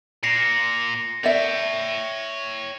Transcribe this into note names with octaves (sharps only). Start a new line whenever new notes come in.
A#2 A#6 C7 C#7
C7
C#5 D5 E5 G5